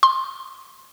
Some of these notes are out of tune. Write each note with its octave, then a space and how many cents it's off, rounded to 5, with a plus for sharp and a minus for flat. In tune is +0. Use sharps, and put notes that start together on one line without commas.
C6 +15